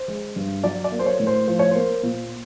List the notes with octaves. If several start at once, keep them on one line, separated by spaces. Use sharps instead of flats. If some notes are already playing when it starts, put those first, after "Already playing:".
Already playing: C5
G#3
G2
F#3 D5
D5
A#3
C5
C#5
A2
C5
F3 C5
C#5
A#3 C5
A#2